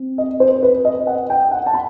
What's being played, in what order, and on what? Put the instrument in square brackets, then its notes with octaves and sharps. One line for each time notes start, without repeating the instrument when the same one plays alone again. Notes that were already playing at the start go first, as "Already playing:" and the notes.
Already playing: [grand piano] C4
D#5
C5
B4
D#5
F#5
G5
F#5
A5
B5